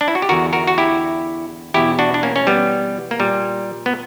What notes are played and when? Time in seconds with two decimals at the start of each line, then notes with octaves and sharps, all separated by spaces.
0.01 D4
0.08 E4
0.15 F#4
0.22 G4
0.29 E2 D3 F#4 A#4
0.53 F#4 A#4
0.67 F#4
0.78 E4 G4
1.74 E2 B2 E4 G4
1.99 D4 F#4
2.14 D4
2.23 A#3 C#4
2.36 C#4
2.47 G3 B3
3.11 A#3
3.19 A#2 G3
3.86 B3